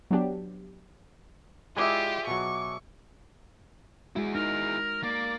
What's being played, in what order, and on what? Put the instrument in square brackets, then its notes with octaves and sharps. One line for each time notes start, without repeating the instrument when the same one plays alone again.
[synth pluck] F#3 B3 D4 G4
[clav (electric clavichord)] G#3 E4 [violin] F4 G4 [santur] G#4 D5 E5
[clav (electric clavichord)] B2 F#3 [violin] C#6
[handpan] G#3 F#4 [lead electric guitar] E4 G#4
[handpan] D#4 [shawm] A#4
[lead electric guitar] A#3 [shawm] D5